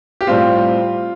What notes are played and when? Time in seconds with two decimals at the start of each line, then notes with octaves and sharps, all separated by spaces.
0.21 G4
0.27 A2 G3 C4 F4